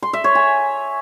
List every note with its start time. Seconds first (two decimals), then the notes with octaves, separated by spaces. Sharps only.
0.03 C6
0.13 E5
0.24 C#5
0.35 G#5